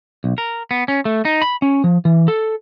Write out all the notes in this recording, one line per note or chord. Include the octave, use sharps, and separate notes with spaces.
B1
A#4
B3
C#4
A3
D#4
B5
C#4
F3
E3
A4